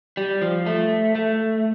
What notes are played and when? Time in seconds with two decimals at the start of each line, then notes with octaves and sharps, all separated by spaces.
0.17 G3
0.42 F3
0.66 A3
1.15 A3